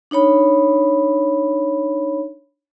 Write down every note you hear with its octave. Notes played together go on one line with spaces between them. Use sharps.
D4 D#4 C#5 B5